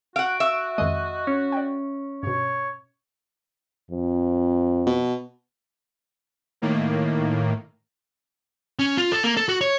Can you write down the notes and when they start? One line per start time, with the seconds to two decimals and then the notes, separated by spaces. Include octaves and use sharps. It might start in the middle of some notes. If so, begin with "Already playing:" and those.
0.16 F#4 F5 F#5 D7
0.40 E5 F5 C#6 D#6
0.78 F2 D#3 G#3 D#5
1.27 C#4
1.52 D5 G5
2.23 G2 B2 C#5
3.91 F2
4.86 B2
6.62 A2 D#3 A#3
8.79 C#4
8.97 F4
9.12 A4
9.24 A#3
9.37 A4
9.48 F#4
9.61 C#5